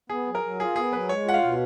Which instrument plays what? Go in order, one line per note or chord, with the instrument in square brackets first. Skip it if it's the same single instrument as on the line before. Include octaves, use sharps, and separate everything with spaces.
[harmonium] B3 [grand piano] G#4
[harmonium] F#3
[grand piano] A#4
[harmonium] F#3
[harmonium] F4 [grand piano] G#4
[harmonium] B3 [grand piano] G#4
[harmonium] F#3 [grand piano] B4
[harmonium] G#3 [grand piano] C#5
[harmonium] F4 [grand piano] F#5
[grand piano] F5
[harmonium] B2